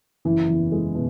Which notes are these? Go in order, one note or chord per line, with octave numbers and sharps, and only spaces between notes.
F#1 E3
E2
G#3
B2